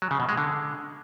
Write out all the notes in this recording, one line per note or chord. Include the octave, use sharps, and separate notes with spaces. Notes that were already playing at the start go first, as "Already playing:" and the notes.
F#3
C#3
B2
G#3
D3